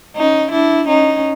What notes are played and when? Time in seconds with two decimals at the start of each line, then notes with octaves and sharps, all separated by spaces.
0.16 C#4 D#4
0.52 D4 E4
0.88 C#4 D#4